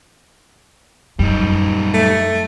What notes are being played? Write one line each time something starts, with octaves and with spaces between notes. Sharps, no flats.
F#2 G3 D#4
A3